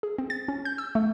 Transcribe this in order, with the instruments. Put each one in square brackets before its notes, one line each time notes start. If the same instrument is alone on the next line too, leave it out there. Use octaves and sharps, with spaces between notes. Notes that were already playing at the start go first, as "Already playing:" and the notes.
[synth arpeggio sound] G#4
C4
A6
C#4
G6
E6
A3